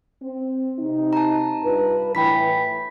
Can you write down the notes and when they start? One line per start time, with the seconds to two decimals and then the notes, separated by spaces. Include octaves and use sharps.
0.22 C4
0.78 C3 D#4
1.13 A5 A#5
1.63 G2 F4 B4
2.15 A2 E3 G5 B5 B6